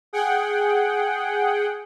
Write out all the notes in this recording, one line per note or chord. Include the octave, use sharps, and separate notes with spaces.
G#4 F#5 G5